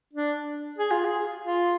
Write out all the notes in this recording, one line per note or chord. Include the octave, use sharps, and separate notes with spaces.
D4
G#4
F4
G#4
F4